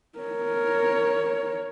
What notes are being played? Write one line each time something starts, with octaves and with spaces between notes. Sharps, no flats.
A#4 C#5